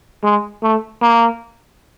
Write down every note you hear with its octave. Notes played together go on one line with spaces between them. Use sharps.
G#3
A3
A#3